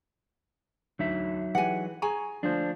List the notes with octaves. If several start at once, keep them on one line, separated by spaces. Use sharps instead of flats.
D2 F#3 D#4 E5
E3 G#3 G4 F#5 G#5
G#4 G#5 A#5 C#6
D3 F3 A3 D4 C5